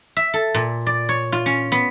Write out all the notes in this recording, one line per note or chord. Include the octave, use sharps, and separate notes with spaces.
E5
A4
A#2
D5
C#5
F4
C#4
B3